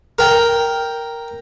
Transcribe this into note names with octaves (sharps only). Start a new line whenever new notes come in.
A#4 G5